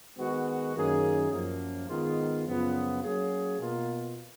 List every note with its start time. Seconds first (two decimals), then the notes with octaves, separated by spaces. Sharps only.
0.18 D#3 G#3 B3 F#4
0.75 F#2 D#3 A#3 C#4 G#4
1.32 F#2 F3 A#3
1.88 G#2 D#3 G#3 B3 F4
2.45 F#2 C#3 F3 B3 F4
3.03 F#3 A#3 C#4 G#4
3.59 B2 A#3 F4